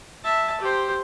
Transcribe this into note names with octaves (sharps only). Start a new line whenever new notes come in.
E5 A5
G4 C5